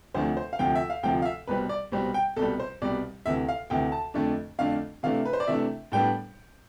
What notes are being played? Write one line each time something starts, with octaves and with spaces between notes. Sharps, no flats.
D2 C3 F3 A3 D4 C5
C5
F5
D2 C3 F3 G5
E5
F5
D2 C3 F3 G5
F5
E5
C2 B2 G3 C4 B4
D5
C2 B2 G3 C4
G5
C2 B2 G3 A4
C5
C2 B2 G3 D5
D2 C3 E3 E5
F5
D2 C3 E3 G5
A5
F2 D3 A3 D4
F2 D3 A3 D4 F5
C3 E3 A3 D4 F5
B4
C5
D5
C3 E3 A3 D4 E5
A2 G3 B3 D4 G5